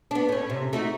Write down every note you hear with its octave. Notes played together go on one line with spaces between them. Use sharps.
B3 D4
A2 C#4
C3
A3 D#4 F#4